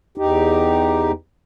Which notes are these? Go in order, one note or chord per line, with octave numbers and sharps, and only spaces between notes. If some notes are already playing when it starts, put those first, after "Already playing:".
E2 D#4 G4